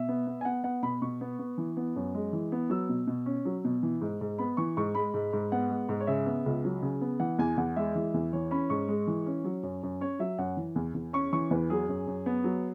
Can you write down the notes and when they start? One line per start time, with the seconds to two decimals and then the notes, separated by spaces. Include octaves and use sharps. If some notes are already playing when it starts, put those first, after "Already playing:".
Already playing: B2 E5
0.09 B3
0.27 B3
0.41 G#5
0.45 B3 F#5
0.64 B3 F#5
0.83 B2 B5
1.02 B2 C#6
1.21 B3
1.39 B3
1.58 E3
1.77 B3
1.96 F#2
2.14 G#3
2.33 E3
2.52 B3
2.70 F#3 E6
2.89 B2
3.07 B2
3.26 C#4
3.45 F#3
3.64 B2
3.83 E3
4.01 G#2
4.21 G#2
4.38 B3 B5
4.57 E3 C#6
4.77 G#2 C#6
4.95 G#3 B5
5.14 G#2
5.33 G#2
5.52 B3 F#5
5.70 G#3
5.89 G#2
6.00 C#5
6.07 C#3 E5
6.26 B3
6.46 C#2
6.64 F#3
6.82 C#3
7.01 B3
7.20 E3 F#5
7.39 E2 G#5
7.57 E2 F#5
7.76 G#3 E5
7.95 E3
8.14 E2
8.33 E3 C#5
8.51 C#4 B5
8.70 G#2 C#6
8.88 G#3
9.07 E3
9.26 C#4
9.44 F#3
9.63 F#2
9.83 F#2
10.01 C#4 C#5
10.19 F#3 E5
10.38 F#2 F#5
10.57 E3
10.76 E2
10.94 E2
11.13 C#4 C#6
11.33 E3 C#6
11.51 E2 B4
11.70 F#3 G#4
11.88 F#2
12.07 F#2
12.26 B3
12.44 F#3